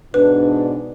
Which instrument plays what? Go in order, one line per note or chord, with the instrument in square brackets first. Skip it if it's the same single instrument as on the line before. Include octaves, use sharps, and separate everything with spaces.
[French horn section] G#2 B2 D4 [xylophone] B4